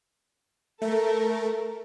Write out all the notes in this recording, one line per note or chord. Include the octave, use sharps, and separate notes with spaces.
A3 A4 A#4